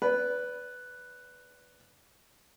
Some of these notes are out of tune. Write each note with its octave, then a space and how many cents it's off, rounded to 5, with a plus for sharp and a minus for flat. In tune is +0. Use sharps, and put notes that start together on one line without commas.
B4 +0 D5 -30